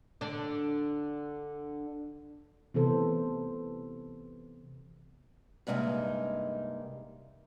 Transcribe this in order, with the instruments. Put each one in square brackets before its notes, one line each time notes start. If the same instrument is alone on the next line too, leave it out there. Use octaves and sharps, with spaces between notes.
[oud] D3 D4
[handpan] C3 E3 B3 A4 C5
[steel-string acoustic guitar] G2 C3 G#3 A#3 D#4